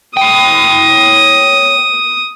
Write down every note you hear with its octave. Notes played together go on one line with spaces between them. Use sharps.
C#5 G5 D#6